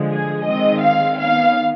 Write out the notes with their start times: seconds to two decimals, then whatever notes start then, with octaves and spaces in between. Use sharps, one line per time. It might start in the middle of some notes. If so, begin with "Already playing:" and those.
Already playing: D3 F3 G#3
0.09 G#4
0.45 D#3 G#3 C4 D#5
0.81 F5
1.17 D#3 B3 F5